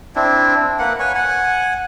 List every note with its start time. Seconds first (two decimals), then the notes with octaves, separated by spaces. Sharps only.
0.16 C4 D4 E4
0.79 A#3 B4 F#5
1.00 B4 C#5 G#5 C#6
1.15 F#5 G#5